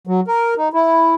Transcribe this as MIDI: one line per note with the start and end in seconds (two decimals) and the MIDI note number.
0.07 0.21 54
0.28 0.54 70
0.57 0.69 63
0.73 1.15 64